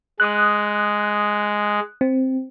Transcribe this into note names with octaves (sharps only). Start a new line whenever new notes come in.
G#3 D#6 F#6
C4